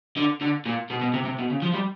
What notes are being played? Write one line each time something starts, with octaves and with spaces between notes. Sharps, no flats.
D3
D3
A#2
B2
B2
C3
C3
B2
C#3
F3
G3